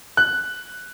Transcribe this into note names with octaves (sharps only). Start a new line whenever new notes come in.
F#6